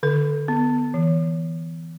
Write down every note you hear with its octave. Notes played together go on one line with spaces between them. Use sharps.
D3 A4
B3
E3